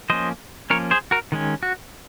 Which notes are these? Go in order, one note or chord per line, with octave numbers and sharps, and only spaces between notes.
F3 A#3 C#4 C5 D#5
F3 A#3 C#4 A#4 C#5
G#4 C5
F#4 A#4
D#3 G#3 C#4
F#4